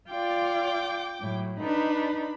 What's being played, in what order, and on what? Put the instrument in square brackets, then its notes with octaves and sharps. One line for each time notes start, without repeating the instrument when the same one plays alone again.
[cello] F4 D5 [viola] G5 D6
[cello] A2 F#3
[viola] D4 B5 [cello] D#4 B4